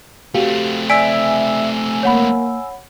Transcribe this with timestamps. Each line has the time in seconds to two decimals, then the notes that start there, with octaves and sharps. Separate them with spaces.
0.34 A3 C4 F#4 G4 F5
0.90 D5 E5 G#5 E6 B6 D7
2.03 A#3 C#5 F#5 B5